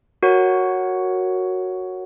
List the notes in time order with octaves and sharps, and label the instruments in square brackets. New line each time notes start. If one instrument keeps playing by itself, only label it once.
[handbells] F#4 A#4 C#5 F#5